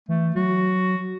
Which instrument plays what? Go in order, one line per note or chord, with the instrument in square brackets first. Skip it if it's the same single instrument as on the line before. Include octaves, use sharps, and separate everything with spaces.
[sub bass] E3 [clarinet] A3
[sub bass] F#3 [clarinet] F#4